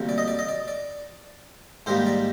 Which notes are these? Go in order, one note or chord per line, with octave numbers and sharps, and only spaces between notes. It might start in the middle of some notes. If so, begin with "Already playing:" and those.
Already playing: D2 C3 G3 A#3
D5
D#5
D5
D#5
D5
D5
G#2 D#3 G3 A#3 C5
D5